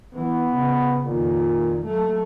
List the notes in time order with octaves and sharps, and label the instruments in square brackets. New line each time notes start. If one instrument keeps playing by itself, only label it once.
[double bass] E3 [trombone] B3
[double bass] C#3
[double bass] F2 D#3 [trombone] A#2
[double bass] F#3 A3